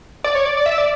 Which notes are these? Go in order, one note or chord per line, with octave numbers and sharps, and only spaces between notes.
D5
C#5
D5
D5
E5
D5